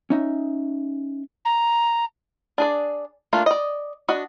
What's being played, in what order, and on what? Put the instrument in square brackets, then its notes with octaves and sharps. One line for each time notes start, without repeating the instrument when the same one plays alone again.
[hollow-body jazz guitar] C#4 D#4 E5
[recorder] A#5
[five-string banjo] D4 G#4 D5
A3 A#3 D4 F4
D5 D#5
D4 F#4 D#5